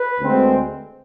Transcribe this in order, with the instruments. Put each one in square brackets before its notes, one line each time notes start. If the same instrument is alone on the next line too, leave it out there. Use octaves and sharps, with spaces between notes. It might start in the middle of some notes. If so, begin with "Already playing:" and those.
Already playing: [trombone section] B4
D2 D3 G#3 C4